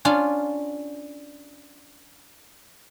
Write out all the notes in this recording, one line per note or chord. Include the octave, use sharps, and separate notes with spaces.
C#4 D4 F4